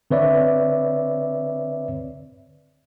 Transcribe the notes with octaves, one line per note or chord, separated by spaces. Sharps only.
D3 C4 B4 C#5 D5 E5